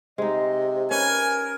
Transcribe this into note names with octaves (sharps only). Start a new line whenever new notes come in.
C3 G#3 D#4 D#5
C#4 G4 A#4 B4 G#5